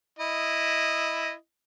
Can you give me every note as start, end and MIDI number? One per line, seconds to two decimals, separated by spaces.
0.19 1.33 64
0.19 1.33 75